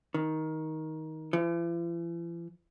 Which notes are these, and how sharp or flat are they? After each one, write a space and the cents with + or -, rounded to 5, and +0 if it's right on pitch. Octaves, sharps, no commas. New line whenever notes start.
D#3 +15
E3 +45